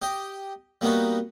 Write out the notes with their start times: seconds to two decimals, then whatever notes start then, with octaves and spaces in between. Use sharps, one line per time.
0.02 G4 D#5
0.81 G3 A#3 B3 D#4 F#4